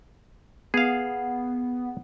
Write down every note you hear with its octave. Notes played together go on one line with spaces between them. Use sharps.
B3 G#4 F5